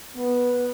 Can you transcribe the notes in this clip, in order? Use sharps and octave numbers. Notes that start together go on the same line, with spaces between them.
B3